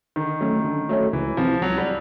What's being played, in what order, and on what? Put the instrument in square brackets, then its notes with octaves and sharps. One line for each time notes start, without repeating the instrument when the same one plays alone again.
[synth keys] D3 [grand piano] D#3
[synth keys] F#3 A3 C#4
D3
F#3 A3 C#4
[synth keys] C#2 [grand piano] E3
[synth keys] C3 E3 [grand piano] F3
[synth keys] C#2 [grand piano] F#3
[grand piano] G3